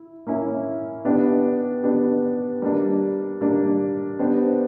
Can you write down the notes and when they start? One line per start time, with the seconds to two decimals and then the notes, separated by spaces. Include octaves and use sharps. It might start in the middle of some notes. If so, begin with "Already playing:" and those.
Already playing: E4
0.27 A#3 C#4 E4
1.05 B3 D4 G4
1.83 B3 D4 G4
2.62 G3 A#3 D4
3.41 G3 A#3 D4
4.19 B3 D4 G4 C5